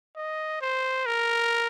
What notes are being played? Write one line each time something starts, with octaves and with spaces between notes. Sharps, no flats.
D#5
C5
A#4